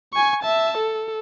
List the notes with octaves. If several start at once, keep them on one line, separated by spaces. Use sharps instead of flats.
G#5 C#6
E5 A5
A4